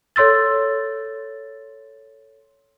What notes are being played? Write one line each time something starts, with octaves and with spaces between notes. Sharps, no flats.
A4 C#5 C6 E6 A6